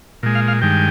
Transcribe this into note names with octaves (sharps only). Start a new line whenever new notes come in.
A#2 G#3
F5
F5
G2 D#3 G#3 G5